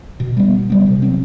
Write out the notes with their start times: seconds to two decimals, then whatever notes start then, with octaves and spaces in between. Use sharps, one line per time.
0.20 B2
0.37 G3 B3
0.52 B2
0.70 G3 B3
0.86 C3
1.02 F#3 C4